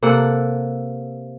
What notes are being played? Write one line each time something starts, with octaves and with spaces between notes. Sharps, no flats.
C3 A#3 A4 F#5